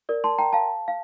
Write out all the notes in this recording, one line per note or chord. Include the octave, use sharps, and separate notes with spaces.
A#4 D5
A5 C6
G5 A#5
F5 A5
F5